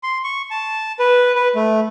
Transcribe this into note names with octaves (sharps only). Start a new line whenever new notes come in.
C6
C#6
A5
B4
B4
A3